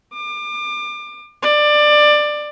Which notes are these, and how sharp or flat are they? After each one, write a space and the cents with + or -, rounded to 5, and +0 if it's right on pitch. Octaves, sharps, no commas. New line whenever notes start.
D6 +30
D5 +20